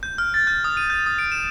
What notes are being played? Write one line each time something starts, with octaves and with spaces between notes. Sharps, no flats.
G6
F6
A6
G6
D#6
D#7
G6
D#6
D7
E7